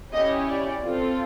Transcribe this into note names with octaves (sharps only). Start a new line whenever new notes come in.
C#4 E4 G4 D#5
D5
C4 F4 A4